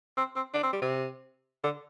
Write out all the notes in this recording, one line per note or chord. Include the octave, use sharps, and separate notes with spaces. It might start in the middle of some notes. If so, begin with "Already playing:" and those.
C4
C4
D4
C4
G3
C3
D3